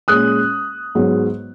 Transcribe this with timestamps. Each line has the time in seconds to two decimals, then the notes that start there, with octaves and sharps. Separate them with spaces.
0.08 A#2 G#3 C#4 D#6 F#6
0.95 G#2 F#3 B3